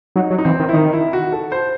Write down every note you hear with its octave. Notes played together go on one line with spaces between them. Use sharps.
F#3 D#4
F#3
D#4
E3 C4
D#3
E4
D#3 D#4
E4
F#4
A4
C5